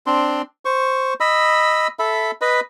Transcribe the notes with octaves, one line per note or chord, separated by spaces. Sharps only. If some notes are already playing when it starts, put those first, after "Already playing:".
C4 D4 C6
C5 C#6
D#5 B5 E6
A4 E5 B5
B4 D#5 B5